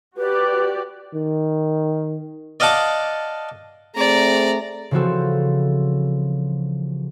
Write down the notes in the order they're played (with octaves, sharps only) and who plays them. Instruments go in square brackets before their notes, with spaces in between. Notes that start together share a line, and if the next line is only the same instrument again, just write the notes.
[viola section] F#4 G4 D5 [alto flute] B4
[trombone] D#3
[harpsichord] D5 D#5 F5 F#5 A5 D6
[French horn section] A3 C4 G#4 [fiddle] D5 A#5
[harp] C#3 E3 F3 C4 F#4 A4